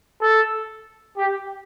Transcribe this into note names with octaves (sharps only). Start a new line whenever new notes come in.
A4
G4